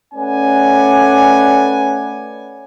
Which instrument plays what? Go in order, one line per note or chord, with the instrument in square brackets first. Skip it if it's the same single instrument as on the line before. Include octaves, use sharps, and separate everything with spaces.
[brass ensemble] A3 C#4 B4 D5 F#5 G#5